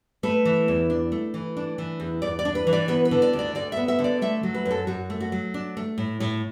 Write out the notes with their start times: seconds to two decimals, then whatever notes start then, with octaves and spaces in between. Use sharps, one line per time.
0.23 A3 B4
0.45 E3
0.68 E2
0.90 D4
1.12 A3
1.34 E3
1.57 D4
1.78 E3
2.00 E2
2.22 E2 D5
2.39 D5
2.45 D4
2.55 B4
2.67 E3
2.73 D5
2.88 B3 B4
3.05 B4
3.11 D3
3.22 D5
3.33 D2
3.39 D5
3.55 D2 D5
3.72 B3 E5
3.88 E5
3.99 D3
4.04 D5
4.22 A3 E5
4.43 F#3
4.54 B4
4.65 F#2
4.71 A4
4.87 F#2 F#4
5.10 A3
5.20 F#4
5.32 F#3
5.54 D4
5.77 A3
5.98 A2
6.20 A2